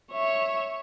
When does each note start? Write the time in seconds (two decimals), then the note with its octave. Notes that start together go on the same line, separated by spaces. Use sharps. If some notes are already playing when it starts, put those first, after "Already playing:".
0.13 C#5 E5